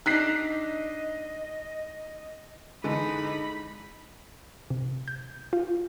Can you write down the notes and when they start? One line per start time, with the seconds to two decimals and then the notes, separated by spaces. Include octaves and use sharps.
0.06 D4 D#4 D#5 F#6 B6 C7
2.84 D3 E3 G#3 D#4 B5
4.70 C3
5.08 G6
5.53 F4